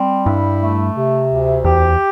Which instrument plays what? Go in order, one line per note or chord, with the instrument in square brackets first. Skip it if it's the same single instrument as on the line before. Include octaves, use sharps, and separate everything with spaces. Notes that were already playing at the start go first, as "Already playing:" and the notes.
Already playing: [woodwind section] G3 C4
[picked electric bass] G2 [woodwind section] E4
[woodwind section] A3
C3
D2
[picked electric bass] E2 [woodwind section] G4